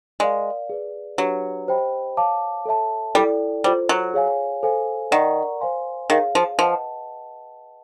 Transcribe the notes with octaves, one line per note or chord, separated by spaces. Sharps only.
G#3 A#4 D5 F5
G#4 B4 D5
F#3 D4 G4 B4
G4 C5 D#5 G5 B5
C#5 F5 A5 D6
A4 C#5 E5 A5
G3 E4 A4 D5 G5
G3 F4 A4 C5
F#3
G#4 C#5 F5 G#5
A4 C5 F5 G#5
D#3 A#4 D5 F#5 A#5 C#6
C5 F5 G#5 C6
D#3 G#4 C#5 F5
F3
F3 B4 D#5 F#5 A5